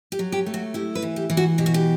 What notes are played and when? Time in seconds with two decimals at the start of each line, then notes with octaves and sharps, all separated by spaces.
0.12 G4
0.19 F#3
0.32 G4
0.46 A3
0.54 F#4
0.74 E4 G4
0.95 B4
1.02 E3
1.16 G4
1.30 E3
1.37 F#4
1.58 B2 G4
1.66 F#4
1.74 G4